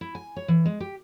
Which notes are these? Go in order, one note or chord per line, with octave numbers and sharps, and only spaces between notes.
E4
G#5
C#5
E3
G#3
G4